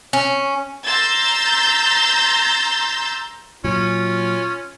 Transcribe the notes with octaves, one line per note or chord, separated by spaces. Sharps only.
C#4
A#5 C6 E6 G6 A6
A#2 F#3 C#4 F4